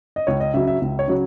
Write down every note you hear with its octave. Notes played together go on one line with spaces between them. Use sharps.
D#5
C#2 C#5
D#5
C#3 F#3 E5
E5
C#2
C#5
C#3 F#3